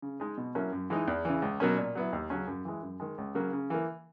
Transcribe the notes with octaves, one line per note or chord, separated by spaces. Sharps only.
C#3
G#3 D#4
B2
F#3 A#3 C#4 E4
F#2
E3 G#3 D#4
E2
C#3 E3
C#2
B2 F#3 A#3 C#4
A#2
F#3 B3 E4
D#2
C#3 F#3 C#4
F#2
E3 G#3
F#2
D#3 G#3
C#2
C#3 F#3 A#3
C#3
E3 A#3